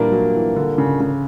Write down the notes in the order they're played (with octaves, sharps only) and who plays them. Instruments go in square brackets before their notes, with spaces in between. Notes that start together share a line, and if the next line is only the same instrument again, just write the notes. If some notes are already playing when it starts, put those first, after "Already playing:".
Already playing: [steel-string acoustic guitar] A#2 G3 A#3 D4 [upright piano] E3
[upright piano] F#3
E3
D3
C#3
C#3